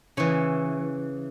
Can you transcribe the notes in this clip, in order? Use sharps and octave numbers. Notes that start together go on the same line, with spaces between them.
C#3 E3 C#5